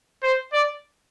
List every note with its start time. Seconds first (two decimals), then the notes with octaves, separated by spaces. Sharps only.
0.23 C5
0.53 D5